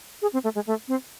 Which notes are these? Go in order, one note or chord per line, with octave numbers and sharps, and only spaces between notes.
G#4
C4
A3
G#3
A3
C4